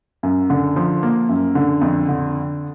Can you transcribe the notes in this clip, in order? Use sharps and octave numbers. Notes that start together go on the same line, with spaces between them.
F#2
D3
F3
A#3
F#2
D3
F2
D3